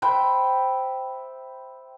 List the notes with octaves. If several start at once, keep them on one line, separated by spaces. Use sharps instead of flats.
C5 E5 G5 B5